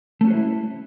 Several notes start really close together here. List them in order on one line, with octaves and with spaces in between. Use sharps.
A3 C#4 F#4 C5 E4